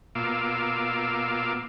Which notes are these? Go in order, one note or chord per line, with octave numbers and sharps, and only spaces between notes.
B2 A#3 F4 F5 D6 E6